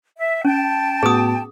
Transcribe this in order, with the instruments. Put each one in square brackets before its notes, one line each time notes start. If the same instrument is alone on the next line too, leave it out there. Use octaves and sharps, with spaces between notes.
[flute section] E5
[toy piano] C#4 [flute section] G5 A5
[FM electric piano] A2 B3 F#4 [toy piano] G#4 D#6